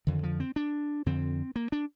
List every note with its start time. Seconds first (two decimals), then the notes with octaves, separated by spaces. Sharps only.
0.07 F2 D3 D#3
0.23 F3
0.40 C4
0.56 D4
1.06 F2 D3 C4
1.56 A#3
1.72 D4